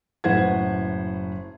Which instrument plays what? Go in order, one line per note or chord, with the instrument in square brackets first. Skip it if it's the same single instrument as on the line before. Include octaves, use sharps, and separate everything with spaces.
[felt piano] F#1 A2 B4 C5 F#5 G#6